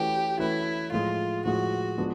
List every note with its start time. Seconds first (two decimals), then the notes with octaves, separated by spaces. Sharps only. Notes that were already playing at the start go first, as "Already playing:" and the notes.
Already playing: E3 A3 C#4 F#4 G4 B4
0.39 E3 A3 C#4 E4 F#4 B4
0.92 A2 F3 G#3 F4
1.45 A2 F3 G#3 F#4
1.98 F3 G#3 B3 D4